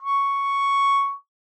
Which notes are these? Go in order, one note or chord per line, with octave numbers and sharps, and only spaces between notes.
C#6